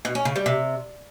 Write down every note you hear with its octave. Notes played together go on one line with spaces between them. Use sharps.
B2
C#4
C#3
G3
C3